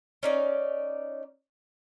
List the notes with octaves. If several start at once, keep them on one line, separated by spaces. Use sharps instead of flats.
C#4 D#4 D5